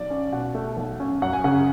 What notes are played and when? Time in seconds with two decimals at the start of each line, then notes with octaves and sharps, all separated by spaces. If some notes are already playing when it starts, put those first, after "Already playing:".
Already playing: B1 D5
0.10 C#4
0.33 B2 F#5
0.55 A3
0.77 B1
1.00 C#4
1.22 F#2 F#5
1.33 G#5
1.44 C#3 F#5